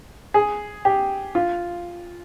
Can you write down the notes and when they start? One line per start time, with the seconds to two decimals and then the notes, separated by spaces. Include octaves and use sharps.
0.34 G#4
0.85 G4
1.35 F4